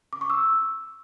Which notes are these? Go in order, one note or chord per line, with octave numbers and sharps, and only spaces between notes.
D6
C#6
E6